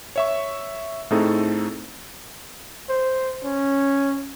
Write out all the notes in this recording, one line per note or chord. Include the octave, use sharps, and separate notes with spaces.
C#5 E5 C#6
A2 A3 C4 D#4 G#4 A4
C5
C#4